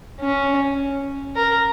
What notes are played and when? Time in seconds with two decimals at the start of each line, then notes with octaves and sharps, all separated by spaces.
0.21 C#4
1.36 A#4